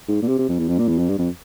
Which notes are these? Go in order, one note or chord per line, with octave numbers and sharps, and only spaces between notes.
G#2
A#2
C3
C3
F2
E2
F2
A#2
E2
F2
G2
F2